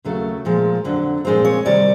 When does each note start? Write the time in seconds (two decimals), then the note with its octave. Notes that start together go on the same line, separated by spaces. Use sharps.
0.04 D#2 C#3 F#3 A3
0.45 A#2 F3 G#3
0.84 F2 D3 F#3
1.25 A#2 F3 G#3 C4
1.45 C#5
1.65 C3 D#3 G3 D5